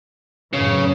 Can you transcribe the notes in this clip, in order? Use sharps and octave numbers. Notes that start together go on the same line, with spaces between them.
F#2 A2 C#3 E3